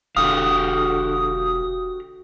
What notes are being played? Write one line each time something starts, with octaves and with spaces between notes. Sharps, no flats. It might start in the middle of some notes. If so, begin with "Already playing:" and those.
E1 D3 F#4 G4 F5 D#6